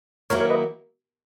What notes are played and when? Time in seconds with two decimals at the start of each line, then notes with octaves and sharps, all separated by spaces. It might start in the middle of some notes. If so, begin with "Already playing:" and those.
0.30 D#3 F#3 A#3 E4 A#4 C#5
0.40 A#4 C#5
0.50 B4 D#5